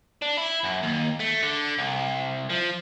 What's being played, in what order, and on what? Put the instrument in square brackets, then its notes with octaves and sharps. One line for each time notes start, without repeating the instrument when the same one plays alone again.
[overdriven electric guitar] D4
E4
F#2
D#2
A3
D3
C2
F3